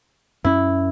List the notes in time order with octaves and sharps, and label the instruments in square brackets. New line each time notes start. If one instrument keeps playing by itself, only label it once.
[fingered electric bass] F#2 C#4 [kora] E4